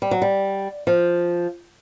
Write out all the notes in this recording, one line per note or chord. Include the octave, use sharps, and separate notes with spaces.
G3
F#3
G3
F3